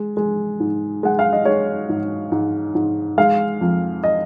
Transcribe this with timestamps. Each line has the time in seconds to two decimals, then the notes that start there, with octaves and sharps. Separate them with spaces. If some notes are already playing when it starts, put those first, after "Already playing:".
Already playing: G#3
0.17 G#3
0.60 G#2
1.03 G#3 F#5
1.19 F5
1.33 D#5
1.45 G#3 C#5
1.89 G#2
2.32 G#2
2.75 G#2
3.18 G#3 F5
3.61 F2
4.04 D#5